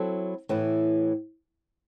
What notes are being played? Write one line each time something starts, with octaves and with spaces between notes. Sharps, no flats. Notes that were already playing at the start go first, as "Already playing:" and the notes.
Already playing: F#3 C4 E4 A4
A2 E3 B3